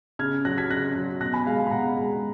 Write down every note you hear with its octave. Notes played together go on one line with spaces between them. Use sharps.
C#3 F6 G#6
F#3 F#6 A#6
G#6 B6
C#3 F#6 A#6
F#3
B2 F#6 A#6
G#5 B5
G#3 F5 G#5
F5 G#5
B5
B2 F#5 A#5
G#3